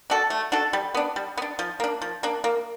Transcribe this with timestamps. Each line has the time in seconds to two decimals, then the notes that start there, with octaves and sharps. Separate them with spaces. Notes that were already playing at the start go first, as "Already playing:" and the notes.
0.10 D4 F#4 A4
0.30 A3
0.52 D4 F#4 A4
0.73 G3
0.94 B3 D4
1.16 G3
1.37 B3
1.42 D4
1.59 F3
1.80 A#3 D4
2.01 F3
2.23 A#3 D4
2.44 A#3